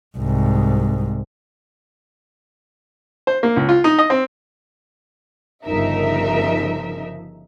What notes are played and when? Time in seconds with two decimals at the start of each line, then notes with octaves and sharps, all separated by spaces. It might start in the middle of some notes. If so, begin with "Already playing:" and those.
0.18 C2 G#2
3.27 C5
3.43 A#3
3.56 C#2
3.69 F4
3.84 D#4
3.98 D#5
4.10 C4
5.65 G1 C#3 F3 D#4 A#4 E5